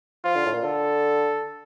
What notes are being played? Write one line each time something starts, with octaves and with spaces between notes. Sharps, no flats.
F3 F4
D3
A2
A#2
D3 A4